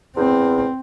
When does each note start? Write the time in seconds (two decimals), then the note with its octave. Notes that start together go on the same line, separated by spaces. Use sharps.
0.17 E2 C4